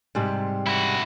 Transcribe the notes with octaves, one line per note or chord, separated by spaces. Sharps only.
G#2 C3 G3
E4 F#4